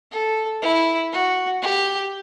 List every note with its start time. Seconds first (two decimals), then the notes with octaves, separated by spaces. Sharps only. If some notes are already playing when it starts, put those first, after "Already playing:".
0.12 A4
0.62 E4
1.12 F#4
1.62 G4